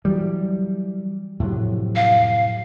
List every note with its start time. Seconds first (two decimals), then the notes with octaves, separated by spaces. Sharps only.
0.05 E3 F#3 G3
1.40 F2 A2 C3 F#3
1.96 F5